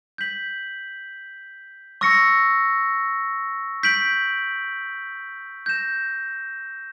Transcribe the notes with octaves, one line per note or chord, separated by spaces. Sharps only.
G6 B6 F#7
C#6 E6 A#6 C#7
G6 B6 D7 F#7
G6 A#6 E7